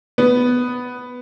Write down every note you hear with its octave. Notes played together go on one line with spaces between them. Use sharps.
B3